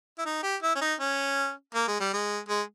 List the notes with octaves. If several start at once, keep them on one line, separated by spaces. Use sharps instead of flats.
E4
D#4
G4
E4
C#4
D#4
C#4
A#3
G#3
G3
G#3
G#3